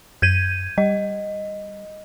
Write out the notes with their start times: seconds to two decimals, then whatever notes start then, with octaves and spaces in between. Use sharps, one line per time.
0.22 F#2 G6 G#6 D#7
0.78 G3 D#5